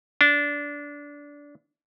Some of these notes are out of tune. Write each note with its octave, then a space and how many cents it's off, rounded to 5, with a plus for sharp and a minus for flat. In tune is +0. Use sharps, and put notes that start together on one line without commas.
D4 -20